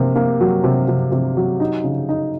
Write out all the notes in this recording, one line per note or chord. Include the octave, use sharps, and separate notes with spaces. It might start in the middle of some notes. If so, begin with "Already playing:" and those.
Already playing: C3 A#3
A#3
F#3
C3
C3
C3
F#3
D#4
C#3
D#4